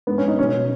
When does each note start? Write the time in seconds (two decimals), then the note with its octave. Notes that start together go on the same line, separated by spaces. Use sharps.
0.07 G#2 B3
0.18 C#4
0.22 G#2
0.28 D#4
0.39 B2 C#4
0.54 B2